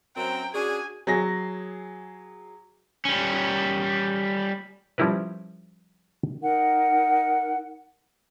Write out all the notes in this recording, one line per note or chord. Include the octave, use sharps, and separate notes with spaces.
F#2 C4 G5 A#5
C#4 D4 F#4 G#4 G#5
F#3 G#4 A#6
G3 C#4
F3 G3 C#4 E4 A#4 B4
D#4 A#4 F#5